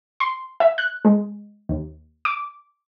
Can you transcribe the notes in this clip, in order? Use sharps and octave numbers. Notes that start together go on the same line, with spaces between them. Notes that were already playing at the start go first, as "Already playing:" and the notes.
C6
E5
F#6
G#3
D#2
D6